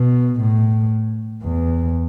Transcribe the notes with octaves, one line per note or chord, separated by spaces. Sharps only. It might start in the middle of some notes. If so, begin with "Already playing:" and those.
Already playing: B2
A2
E2